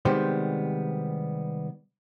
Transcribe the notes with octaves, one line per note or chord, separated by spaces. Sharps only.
C3 D#3 G3 G#3 B3 C5